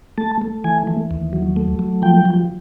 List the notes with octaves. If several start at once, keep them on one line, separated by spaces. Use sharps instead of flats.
A3 A5
A3
E3 G#5
E3
D#2
F#3
A3
F#3
F3 G5
F3